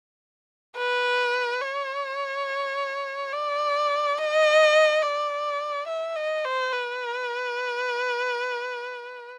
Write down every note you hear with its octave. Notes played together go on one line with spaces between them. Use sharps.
B4
C#5
D5
D#5
D5
E5
D#5
C5
B4